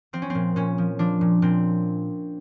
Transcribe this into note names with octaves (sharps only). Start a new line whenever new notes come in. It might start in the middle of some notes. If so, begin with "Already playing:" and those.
F3 C4
C#4
A#2 C4
A#2 C#4
F3
F3 D4
A#2
A#2 C4